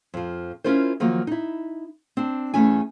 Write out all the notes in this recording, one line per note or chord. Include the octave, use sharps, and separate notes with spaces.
F2 F3
C#4 E4 F4 A#4 C5
D#3 F3 F#3 A#3
D#4 E4
C4 D4
E2 A3 C#4 E4 G#5